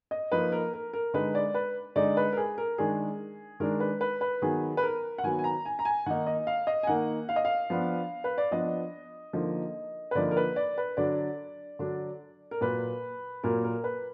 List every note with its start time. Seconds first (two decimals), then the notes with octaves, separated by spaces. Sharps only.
0.11 D#5
0.32 F3 A#3 D#4 B4
0.52 A#4
0.73 A#4
0.93 A#4
1.14 D3 G#3 D#4 B4
1.35 D5
1.54 B4
1.96 D3 G#3 D#4 D5
2.17 B4
2.33 A#4
2.37 G#4
2.58 A#4
2.78 D#3 G#3 D4 G#4
3.60 D#3 G#3 D4 A#4
3.80 B4
4.01 B4
4.21 B4
4.42 D#3 F#3 B3 G#4
4.77 B4
4.83 A#4
5.18 F#5
5.24 D#3 F#3 B3 G#5
5.39 G#5
5.44 A#5
5.65 G#5
5.79 A#5
5.85 G#5
6.06 D#3 A#3 D#4 F#5
6.27 D#5
6.47 F5
6.67 D#5
6.83 G#5
6.87 D#3 A#3 D#4 F#5
7.29 F5
7.36 D#5
7.45 F5
7.70 F3 B3 D4
8.24 B4
8.38 D5
8.51 F3 B3 D4 D#5
9.33 D3 F3 A#3 D#4
10.11 B4
10.15 D3 F3 A#3 D#4 D5
10.31 A#4
10.37 B4
10.56 D5
10.78 B4
10.97 D3 F#3 D4 D5
11.79 D3 F#3 D4
12.51 A#4
12.61 A#2 F#3 A#3 B4
13.43 A#2 F#3 A#3 A#4
13.64 A#4
13.84 B4